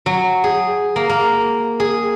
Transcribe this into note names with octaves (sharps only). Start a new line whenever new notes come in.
F#3
G#4
A#3
A#3
G#4